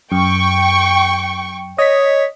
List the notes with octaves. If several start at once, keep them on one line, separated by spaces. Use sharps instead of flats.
F#2 G5 C#6
C#5 D#5 B6